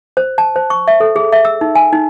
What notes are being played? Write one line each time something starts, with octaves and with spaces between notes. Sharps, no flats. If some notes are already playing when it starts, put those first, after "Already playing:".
C5
A5
C5
C#6
E5
A4
G#4
E5
E6
D#4
G#5
D#4